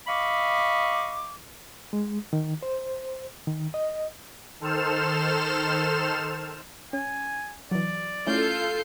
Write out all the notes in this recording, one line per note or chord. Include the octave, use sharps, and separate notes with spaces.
D#5 F5 B5 C#6 D6
G#3
D#3
C5
D#3
D#5
D#3 A4 C5 F6 E7
C#4 G#5
E3 F#3 D5
A3 C#4 E4 F4 A4 G6 C7